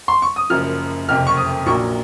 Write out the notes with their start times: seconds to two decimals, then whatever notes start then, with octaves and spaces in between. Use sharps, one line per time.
0.08 C6
0.22 C#6
0.36 D#6
0.50 F#1 F#2 F3 F6
1.08 F#1 F2 C3 F6
1.27 C#6
1.37 D#6
1.66 A#1 A#2 F#3 C#6